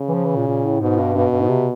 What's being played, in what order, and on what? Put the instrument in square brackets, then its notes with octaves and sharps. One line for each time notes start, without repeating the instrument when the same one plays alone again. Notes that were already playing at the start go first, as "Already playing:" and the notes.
Already playing: [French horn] C#3
[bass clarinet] E3
F3
E3
A#2
A#2
A2
[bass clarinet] G#2 [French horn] B2
[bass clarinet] G2
[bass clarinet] G2 [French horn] B2
[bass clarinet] G2
G#2
C3